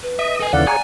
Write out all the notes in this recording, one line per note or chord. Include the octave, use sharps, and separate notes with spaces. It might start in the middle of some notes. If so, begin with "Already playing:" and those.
B4
D#5 E5
A4 G#5
D#2 C#3 E3 A4 D5 F5 F#5
G#4 C#5 G#5 A#5